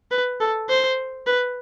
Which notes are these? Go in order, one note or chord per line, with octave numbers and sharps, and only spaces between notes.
B4
A4
C5
B4